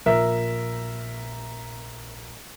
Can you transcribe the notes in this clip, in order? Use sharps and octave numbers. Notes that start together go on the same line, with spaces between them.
A#1 A#4 E5